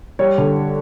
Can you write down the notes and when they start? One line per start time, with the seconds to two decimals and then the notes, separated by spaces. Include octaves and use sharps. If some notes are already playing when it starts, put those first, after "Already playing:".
0.19 G3 C#5
0.38 D3